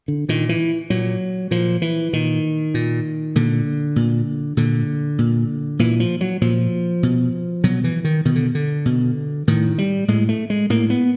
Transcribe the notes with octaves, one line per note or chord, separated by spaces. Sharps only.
D3
A#2 D#3
E3
A#2 F#3
A#2 F3
E3
A#2 D#3
A#2
A#2 D3
A#2
A#2 D3
A#2
A#2 E3
F3
F#3
A#2 F3
B2
B2 F#3
E3
D#3
B2 D#3
D3
D3
B2
A2 D#3
G3
A2 G#3
A3
G#3
A2 A#3
B3